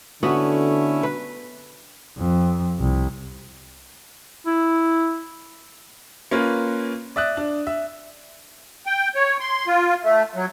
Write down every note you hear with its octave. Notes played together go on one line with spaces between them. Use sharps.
D3 A3 B3 C#4 E4 F#4
B4
F2
C2
E4
A#3 C#4 F4 B4
D5 E5 D#6 F#6
D4
E5
G5
C#5
C6
F4
A3
F#3